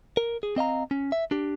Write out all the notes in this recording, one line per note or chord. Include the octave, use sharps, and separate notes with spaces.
A#4
G#4
C4 D#5 F5 A#5
C#4
E5
D4 G4